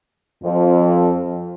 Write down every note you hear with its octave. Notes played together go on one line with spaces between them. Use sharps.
F2